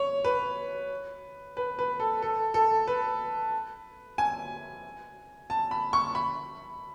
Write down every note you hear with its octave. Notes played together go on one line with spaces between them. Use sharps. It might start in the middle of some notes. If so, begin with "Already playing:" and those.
Already playing: C#5
B4
B4
B4
A4
A4
A4
B4
G#5
A5
B5
C#6
B5